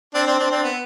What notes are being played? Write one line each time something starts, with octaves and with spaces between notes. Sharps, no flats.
C4 D4
C4 D4
C4 D4
C4 D4
B3